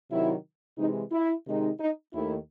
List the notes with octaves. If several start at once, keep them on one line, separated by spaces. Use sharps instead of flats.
C3 D#3 F#3 E4
C3 E3 G#3 D#4
E4
C3 D#3 G#3 D#4
D#4
D#2 D#3 A3 E4